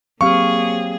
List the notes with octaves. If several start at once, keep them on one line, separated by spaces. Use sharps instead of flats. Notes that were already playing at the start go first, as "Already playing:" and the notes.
F#3 A#3 C4 G4 G#4 F5 C#6 F6